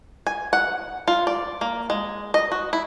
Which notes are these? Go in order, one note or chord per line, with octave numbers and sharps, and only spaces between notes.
G#5
F#5
F4
D5
A#3
G#3
D#5
F#4
E4